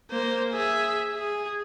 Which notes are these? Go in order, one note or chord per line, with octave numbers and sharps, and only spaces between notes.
A#3 C5
G#4 E5
G#4